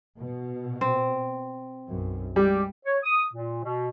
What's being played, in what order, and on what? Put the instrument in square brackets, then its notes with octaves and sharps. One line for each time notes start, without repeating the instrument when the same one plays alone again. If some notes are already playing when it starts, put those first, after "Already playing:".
[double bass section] B2
[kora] C4
[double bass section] B1 F#2
[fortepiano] G3 [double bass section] G#3 [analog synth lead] G4
[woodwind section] C#5
D#6
A#2
B2